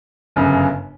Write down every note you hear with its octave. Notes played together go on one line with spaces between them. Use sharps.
G1 F#2 C#3